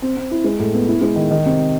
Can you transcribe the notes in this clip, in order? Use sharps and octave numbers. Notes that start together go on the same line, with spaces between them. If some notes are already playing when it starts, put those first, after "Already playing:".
C4
C4
E4
G#3
A2
B3
E4
G#3
D#3
D#3
C3